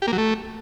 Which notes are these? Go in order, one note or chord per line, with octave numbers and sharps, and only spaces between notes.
G4
A#3
F#3
A3